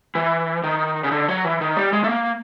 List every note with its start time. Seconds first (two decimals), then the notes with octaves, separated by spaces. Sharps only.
0.15 E3
0.63 D#3
1.04 C#3
1.12 D3
1.28 F#3
1.45 E3
1.61 D#3
1.77 G3
1.93 G#3
2.04 A3
2.09 A#3